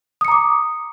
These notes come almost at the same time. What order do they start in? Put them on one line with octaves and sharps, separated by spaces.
D#6 C#7 A#5 D6